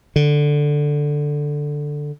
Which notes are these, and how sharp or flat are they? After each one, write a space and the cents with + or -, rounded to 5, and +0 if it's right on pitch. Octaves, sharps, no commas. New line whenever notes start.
D3 +5